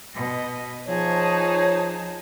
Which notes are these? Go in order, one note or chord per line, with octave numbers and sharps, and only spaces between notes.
B2 D#5
F3 D#4 G#4 C#5 A5